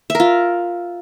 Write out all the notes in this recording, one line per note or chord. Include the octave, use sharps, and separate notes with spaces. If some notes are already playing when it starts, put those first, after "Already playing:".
F4 A#4 E5